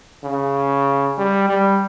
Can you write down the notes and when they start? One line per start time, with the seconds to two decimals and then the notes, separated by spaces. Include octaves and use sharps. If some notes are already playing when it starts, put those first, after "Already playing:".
0.24 C#3
1.18 G3
1.49 G3